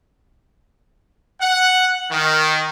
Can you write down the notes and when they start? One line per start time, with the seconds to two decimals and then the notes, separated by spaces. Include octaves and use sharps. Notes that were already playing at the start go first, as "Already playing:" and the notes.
1.41 F#5
2.11 D#3